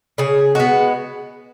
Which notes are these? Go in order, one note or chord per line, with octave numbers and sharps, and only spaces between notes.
C#3 G#4
G#3 B3 F#4